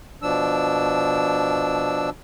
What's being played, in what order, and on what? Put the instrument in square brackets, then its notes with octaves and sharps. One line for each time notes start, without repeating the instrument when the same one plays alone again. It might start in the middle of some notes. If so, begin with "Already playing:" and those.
[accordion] B2 F3 D4 E6